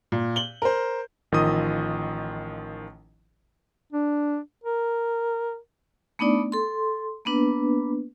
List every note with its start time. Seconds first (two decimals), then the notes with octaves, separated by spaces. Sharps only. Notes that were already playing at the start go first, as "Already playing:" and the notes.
0.12 A#2
0.36 F#7 G7
0.62 A#4 C5
1.32 A1 D#3 F3 F4 D#5 D#6
3.93 D4
4.64 A#4
6.19 A3 B3 D4 D#4 D5
6.52 A4 C6
7.25 A#3 B3 D4 B4